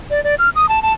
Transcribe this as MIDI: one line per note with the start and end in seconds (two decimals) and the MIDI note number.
0.10 0.23 74
0.24 0.35 74
0.39 0.50 89
0.55 0.69 87
0.69 0.82 81
0.82 0.93 81